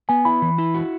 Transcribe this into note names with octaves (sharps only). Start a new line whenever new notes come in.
B3 G#5
E4 B5
E3
E4
F#4